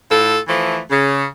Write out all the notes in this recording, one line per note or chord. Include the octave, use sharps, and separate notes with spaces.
A2 F4 A4
E3 F3 A3
C#3